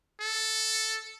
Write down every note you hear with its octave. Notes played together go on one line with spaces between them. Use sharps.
A4